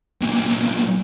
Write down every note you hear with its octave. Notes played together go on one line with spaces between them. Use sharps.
B1 A#2